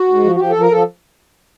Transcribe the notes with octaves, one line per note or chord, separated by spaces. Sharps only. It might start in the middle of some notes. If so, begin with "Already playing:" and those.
Already playing: F#4
G#2
F3
F#4
F3 G4
A4
F3
A#4
F3 A4